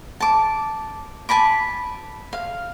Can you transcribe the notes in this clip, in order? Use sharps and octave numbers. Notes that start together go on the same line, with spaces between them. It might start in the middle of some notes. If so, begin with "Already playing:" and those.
A5 D6
G#5 A5 B5 D6
F5